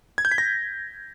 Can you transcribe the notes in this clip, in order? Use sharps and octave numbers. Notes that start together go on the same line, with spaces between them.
G#6
G6
B6
A#6